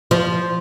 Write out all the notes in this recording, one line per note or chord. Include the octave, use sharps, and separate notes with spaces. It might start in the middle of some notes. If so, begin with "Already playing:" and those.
F3